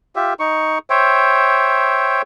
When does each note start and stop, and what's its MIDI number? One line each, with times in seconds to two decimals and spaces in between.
0.16 0.34 65
0.16 0.34 67
0.16 0.34 76
0.40 0.78 63
0.40 0.78 85
0.90 2.22 72
0.90 2.22 73
0.90 2.22 76
0.90 2.22 79